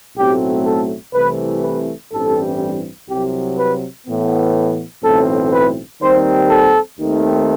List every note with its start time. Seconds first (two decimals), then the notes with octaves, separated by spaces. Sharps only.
0.17 B1 A2 F#3 A3 C4 G4
0.66 A4
1.13 C2 C3 E3 A3 B4
1.63 B4
2.11 A1 G2 E3 G3 C4 A4
3.08 C2 C3 F#3 G4
3.57 B4
4.07 A2 E3 B3
5.03 B1 A2 E3 A3 C4 A4
5.52 B4
6.01 D#2 D#3 G3 C4 C5
6.49 A4
6.98 D#2 D#3 A3 C4